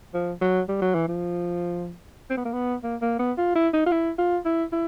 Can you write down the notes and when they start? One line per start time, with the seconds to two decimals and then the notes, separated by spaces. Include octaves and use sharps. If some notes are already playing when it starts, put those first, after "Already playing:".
0.14 F3
0.42 F#3
0.69 G3
0.82 F#3
0.95 E3
1.08 F3
2.30 C4
2.37 B3
2.45 A#3
2.53 B3
2.83 A#3
3.02 A#3
3.19 B3
3.38 F4
3.55 E4
3.74 D#4
3.86 F4
3.92 E4
4.19 F4
4.45 E4
4.72 E4